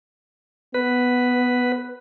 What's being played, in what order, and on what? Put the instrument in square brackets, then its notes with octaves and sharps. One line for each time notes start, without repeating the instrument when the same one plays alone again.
[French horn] B3 [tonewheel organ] B4